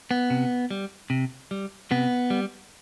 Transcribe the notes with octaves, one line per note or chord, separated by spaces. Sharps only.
B3
C3
G3
C3
G3
C3 B3
G3